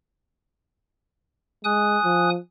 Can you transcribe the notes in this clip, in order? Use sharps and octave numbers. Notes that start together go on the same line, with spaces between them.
G#3 G#5 D#6 F#6
F3